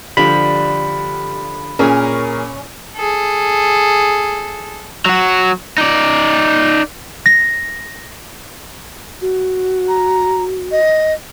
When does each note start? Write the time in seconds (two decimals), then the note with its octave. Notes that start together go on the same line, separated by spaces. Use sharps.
0.17 D3 F3 G3 B5
1.79 A#2 C#4 G#4 A#4
2.97 G#4 A4
5.06 F#3 F#4
5.78 D#4 D5
7.26 A#6
9.22 F#4
9.88 A#5
10.72 D#5